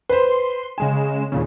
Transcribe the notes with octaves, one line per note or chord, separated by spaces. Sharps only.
B4 C5 C6
C#3 G#3 G#5 E7
D#2 A#2 C#3